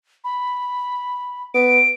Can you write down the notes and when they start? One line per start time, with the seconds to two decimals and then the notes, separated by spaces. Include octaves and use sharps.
0.24 B5
1.54 B3 D7